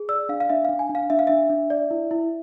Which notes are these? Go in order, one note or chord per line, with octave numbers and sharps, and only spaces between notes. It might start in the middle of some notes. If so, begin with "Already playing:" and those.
Already playing: G#4
D5 E6
D4 F5
F5
D4 E5
D4 F5
G#5
D4
F5
D4 E5
F5
D4 E5
D4
D5
E4
E4